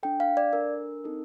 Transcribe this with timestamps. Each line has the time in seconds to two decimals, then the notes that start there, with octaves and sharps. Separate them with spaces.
0.03 D4 A4 G5
0.20 F5
0.37 D5
0.53 D4 A4 A#4
1.04 C4 D#4 A4